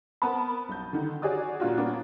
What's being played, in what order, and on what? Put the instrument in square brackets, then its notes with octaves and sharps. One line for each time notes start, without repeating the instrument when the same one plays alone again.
[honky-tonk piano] B3 C4 A#4 A5 B5
B1 G6
D3 D#3
F#4 G#4 C#5 D5 D#6
A#2 D4 F4 F#4
A#3 B3 C#4 D4